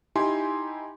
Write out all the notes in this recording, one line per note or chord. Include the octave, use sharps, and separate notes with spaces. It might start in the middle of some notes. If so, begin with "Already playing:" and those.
D#4 E4 G4 G#5 C6